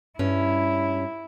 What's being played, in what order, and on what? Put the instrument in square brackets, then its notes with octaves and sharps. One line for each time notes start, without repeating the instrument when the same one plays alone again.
[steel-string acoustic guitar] G2 C#4 [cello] E4